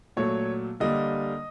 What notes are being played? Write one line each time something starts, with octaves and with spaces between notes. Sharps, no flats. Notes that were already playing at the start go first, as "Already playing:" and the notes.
A#2 F#3 A3 C#5
D3 G3 A#3 D#5